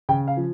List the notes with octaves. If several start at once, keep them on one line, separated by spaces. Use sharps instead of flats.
C#3 G5
F5
F3